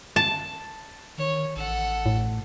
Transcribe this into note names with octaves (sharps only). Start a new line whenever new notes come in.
A5
D#3 C#5
A1 A4 F#5
A2